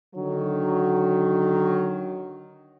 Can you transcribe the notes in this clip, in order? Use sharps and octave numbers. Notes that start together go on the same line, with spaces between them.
D3 D#3 F#3